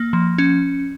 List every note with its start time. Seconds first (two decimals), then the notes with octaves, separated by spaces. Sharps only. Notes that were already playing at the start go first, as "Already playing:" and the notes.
Already playing: A#3
0.13 F3
0.38 C#4